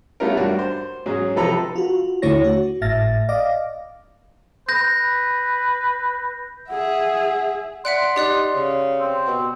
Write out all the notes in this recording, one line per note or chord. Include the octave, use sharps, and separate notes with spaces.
G3 A3 B3 C#4 F4 A#4
G2 D4 F#4
C5
G#2 F#3 C#4 G#4
C3 F3 A4 B4 A#5
F4 F#4
D#2 D3 A3 E4 C#5 A#6
F#4
G#1 A2 E5 F6 A6 A#6
D5 D#5 F5 D6 A#6
B4 G6 A#6
G#4 E5 F#5
D5 E5 F#5 C6 F#6
D#4 G4 D5 F#6
C#3
C4
B2